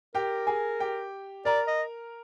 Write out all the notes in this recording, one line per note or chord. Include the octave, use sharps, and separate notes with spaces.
G4 A#4 G5
G#4 G#5
G4 G5
A#4 D5 A#5
D#5